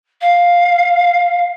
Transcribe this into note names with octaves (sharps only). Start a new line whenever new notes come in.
F5